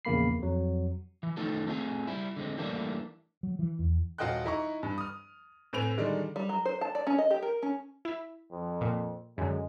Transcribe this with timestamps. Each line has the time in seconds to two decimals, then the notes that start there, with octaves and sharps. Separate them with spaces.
0.05 A#1 E2 C#3 A#3 B5 C7
0.39 F2 F#3
1.23 E3
1.37 D#3 A3 D#4 F4 A4
1.67 A3 C4 F4 G#4
2.07 G3 E4
2.36 D3 G#3 C4
2.58 E3 G3 A3 A#3 D4
3.43 F#3
3.59 E3
3.79 E2
4.18 D#1 F4 F#4 D#5 G5 F#6
4.44 D#4 E4 A#5 C#6
4.83 G2
4.98 D#6 F6
5.73 A2 C4 B4 G#5 D7 F7
5.98 D3 D#3 G3 G#3 D4
6.36 G3
6.49 F#3
6.65 C5
6.81 A5
6.95 D5
7.07 C#4
7.18 D#5
7.31 G4
7.42 A#4
7.63 C#4
8.05 E4 E5
8.52 F2
8.81 A#2
9.38 F#2 D3 G#3